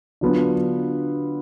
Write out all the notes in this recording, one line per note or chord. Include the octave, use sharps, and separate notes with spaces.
D3 F#3 B3 D4 F4